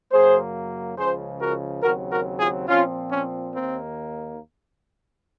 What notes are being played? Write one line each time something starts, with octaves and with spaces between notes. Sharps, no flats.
F#2 C#3 F#3 A#3 G#4 C5
C#2 C#3 F3 G#4 C5
F#4 A#4
D#2 C#3 F#3 C4 F#4 A#4
F#4 A#4
F4 G#4
A#2 F3 C4 C#4 F4
C#4
D#2 D#3 A#3 C4